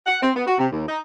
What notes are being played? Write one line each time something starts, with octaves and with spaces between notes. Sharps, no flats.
F#5
C4
B3
F#4
C3
D#2
D#4